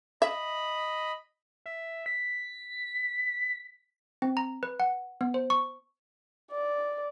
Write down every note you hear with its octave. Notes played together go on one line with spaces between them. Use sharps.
D#5 E5 B5
E5
B6
C4
A#5
B4
F#5
B3
C5
C#6
D5